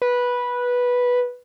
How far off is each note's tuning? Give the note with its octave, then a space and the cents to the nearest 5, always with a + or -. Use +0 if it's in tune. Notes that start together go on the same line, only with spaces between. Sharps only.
B4 -10